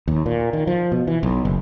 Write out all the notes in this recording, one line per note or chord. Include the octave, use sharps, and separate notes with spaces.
D#2
A#2
D#3
F3
B2
E3
B1
F#1